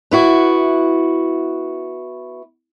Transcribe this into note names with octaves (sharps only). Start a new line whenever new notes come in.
B3 E4 F#4